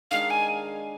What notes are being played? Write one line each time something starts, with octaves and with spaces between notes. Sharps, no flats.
D#3 G#3 D4 G#4 F5
G#5